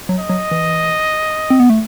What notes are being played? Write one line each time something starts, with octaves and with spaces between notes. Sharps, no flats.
F#3
D#5
F#3
E3
C4
B3
A3